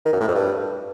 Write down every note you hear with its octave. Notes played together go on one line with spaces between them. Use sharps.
D#3
F#2
A2
F2
G2